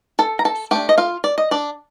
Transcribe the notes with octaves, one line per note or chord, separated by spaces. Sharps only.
A4 A5
A#5
A4 A5
A3 D4 G4 G5
D#5
F4 F5
D5
D#5
D4 D5